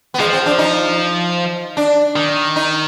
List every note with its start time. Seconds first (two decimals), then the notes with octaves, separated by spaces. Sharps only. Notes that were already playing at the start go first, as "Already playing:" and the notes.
0.14 B3
0.19 F3 G#3
0.33 C4
0.46 D4
0.58 D#4
1.77 D4
2.16 D#3
2.56 D#4